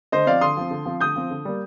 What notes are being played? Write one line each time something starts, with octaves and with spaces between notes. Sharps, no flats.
D3 C5 D#5
F3 C4 D5 F5
D3 C6 D#6
F3 C4
D3
F3 C4
D3 D#6 G6
F3 C4
D3
G3 A#3